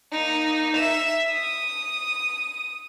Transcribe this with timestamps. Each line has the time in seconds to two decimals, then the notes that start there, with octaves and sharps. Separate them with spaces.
0.12 A#3 D#4
0.77 E5 E7
1.32 D#6